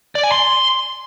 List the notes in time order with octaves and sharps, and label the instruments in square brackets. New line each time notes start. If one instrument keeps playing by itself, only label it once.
[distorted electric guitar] D5
G#5
C6